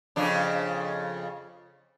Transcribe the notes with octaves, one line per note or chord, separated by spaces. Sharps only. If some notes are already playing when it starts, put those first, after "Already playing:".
F2 C#3 D4